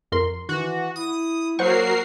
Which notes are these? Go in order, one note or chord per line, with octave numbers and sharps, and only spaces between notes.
F2 A#4 C6
D#3 E3 F#4
E4 D#6
F#3 A#3 F#4 A#4 C5 C#6 C7